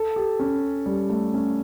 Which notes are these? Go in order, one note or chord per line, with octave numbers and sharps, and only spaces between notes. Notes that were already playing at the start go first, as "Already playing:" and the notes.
Already playing: A4
G4
C#4
G3
A3
C#4